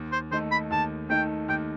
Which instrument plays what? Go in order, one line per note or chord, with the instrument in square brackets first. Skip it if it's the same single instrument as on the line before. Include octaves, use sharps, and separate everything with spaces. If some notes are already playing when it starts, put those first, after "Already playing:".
Already playing: [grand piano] D#2
[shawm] C5
[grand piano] D#3 A3 D#4 [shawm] C5
[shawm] B5
[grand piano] D#2 [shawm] A5
[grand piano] D#3 A3 D#4 [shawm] G5
[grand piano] D#2 [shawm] G5